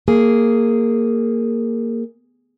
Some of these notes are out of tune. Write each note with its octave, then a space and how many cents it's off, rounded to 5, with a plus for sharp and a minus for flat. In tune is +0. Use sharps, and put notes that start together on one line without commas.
A#3 -10 G#4 +0